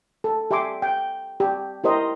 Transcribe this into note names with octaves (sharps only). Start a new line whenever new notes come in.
A4
G4 E5 G#5 C6 D6
G5
G4
E4 G4 A#4 C5 D#5 A#5